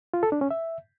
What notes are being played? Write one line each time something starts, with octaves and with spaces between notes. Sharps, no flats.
F4
A4
D4
C#4
E5